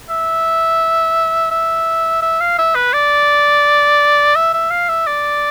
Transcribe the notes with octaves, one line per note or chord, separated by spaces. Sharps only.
E5
E5
E5
F5
E5
B4
D5
E5
E5
F5
E5
D5